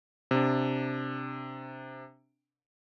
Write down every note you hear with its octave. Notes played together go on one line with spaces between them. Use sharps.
C3 D4